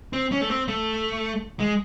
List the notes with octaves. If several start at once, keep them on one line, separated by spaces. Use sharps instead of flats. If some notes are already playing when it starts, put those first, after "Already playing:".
C4
C#4
A3
C4
A3
G#3